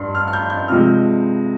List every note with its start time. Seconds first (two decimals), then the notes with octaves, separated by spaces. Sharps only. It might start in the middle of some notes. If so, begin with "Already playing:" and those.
Already playing: G2 G3 C6
0.15 F6
0.27 F6
0.33 G6
0.50 G6
0.68 C3 F3 G#3 F6